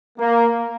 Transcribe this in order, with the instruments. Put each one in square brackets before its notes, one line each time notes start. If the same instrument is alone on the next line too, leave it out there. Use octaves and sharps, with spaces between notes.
[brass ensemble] A#3